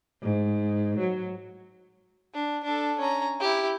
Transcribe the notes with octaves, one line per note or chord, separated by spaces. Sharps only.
G#2
F#3
D4
D4 A4
C#4 A#5
E4 G4